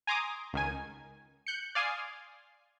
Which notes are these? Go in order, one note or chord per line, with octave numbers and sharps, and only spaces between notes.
G#5 A#5 C6 D6 D#6
C#2 D#3 G#5
F#6 G6 C#7
D5 F5 G#5 C6 D#6